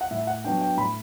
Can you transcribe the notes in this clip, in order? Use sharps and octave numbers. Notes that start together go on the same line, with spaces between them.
F#5
A2 E5
F#5
F#3 B3 D4 G5
G5
A2 B5